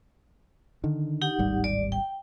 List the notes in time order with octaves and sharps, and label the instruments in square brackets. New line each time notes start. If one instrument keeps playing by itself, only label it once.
[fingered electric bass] D3 D#3
[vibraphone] D#4 G4 F#5
[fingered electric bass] D1 G#1 G3
[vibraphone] D5
G5